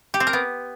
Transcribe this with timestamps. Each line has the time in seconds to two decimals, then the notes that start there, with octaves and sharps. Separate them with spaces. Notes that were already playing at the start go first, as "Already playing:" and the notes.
0.14 G4
0.20 C4
0.27 A#4
0.33 B3